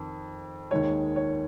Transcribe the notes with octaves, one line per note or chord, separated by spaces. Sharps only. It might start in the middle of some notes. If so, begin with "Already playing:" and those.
Already playing: F2 D#3
D#2 D#3 G#3 C#5
C#5